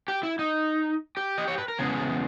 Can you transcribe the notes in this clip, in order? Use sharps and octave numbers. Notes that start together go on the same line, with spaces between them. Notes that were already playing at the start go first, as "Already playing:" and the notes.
G4
E4
D#4
G4
D#5
C#5
B4
A#4
E2 C#3 G#3 B3 G#4